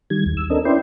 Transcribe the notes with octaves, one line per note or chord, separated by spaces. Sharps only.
D#3 G3 G#6
D#2
E6
C4 D4 A4 A#4 D#5
C#4 E4 B4 D5 G5 C6